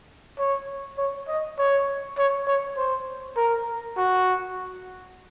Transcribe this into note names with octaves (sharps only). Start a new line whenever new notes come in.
C#5
C#5
D#5
C#5
C#5
C#5
C5
A#4
F#4